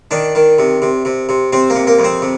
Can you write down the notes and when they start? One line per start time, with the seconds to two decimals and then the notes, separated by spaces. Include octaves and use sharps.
0.11 D#3 D4
0.35 D#3
0.59 C3
0.82 C3
1.05 C3
1.29 C3
1.53 C3 C4
1.70 A#3
1.75 C3
1.87 A#3
1.99 F2
2.04 C4
2.22 C3